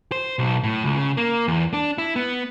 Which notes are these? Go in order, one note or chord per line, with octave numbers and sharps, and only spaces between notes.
C5
B1
A2
C#2
C#3
A#3
E2
D4
E4
B3